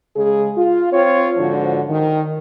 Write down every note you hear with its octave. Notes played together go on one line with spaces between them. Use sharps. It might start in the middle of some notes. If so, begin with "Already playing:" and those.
C#3 G#3 G#4
F4
C4 F4 C#5
G#2 D3 F3 F#4 C5
D#3